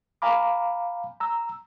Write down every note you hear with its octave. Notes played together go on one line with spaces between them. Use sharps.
F5 G#5 A#5 B5 D6
A#5 E6